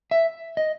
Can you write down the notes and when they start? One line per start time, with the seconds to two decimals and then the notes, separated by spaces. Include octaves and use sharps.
0.11 E5
0.57 D#5